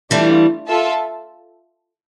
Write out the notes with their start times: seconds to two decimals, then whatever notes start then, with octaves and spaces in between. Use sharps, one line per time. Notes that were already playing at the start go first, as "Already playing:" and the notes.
0.11 E3 G3 A3 D4 F4
0.68 F4 A4 E5 A5